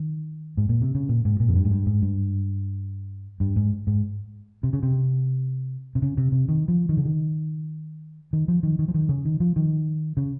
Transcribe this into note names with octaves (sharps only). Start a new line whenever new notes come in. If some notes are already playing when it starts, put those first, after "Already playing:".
Already playing: D#3
G#2
A#2
C3
C#3
A#2
G#2
A#2
F2
G2
G#2
G2
G#2
G2
G2
G#2
G#2
C3
C#3
C3
C3
C#3
C3
C3
D#3
F3
D#3
C#3
D#3
D#3
F3
D#3
D#3
F3
D#3
C#3
D#3
F3
D#3
C#3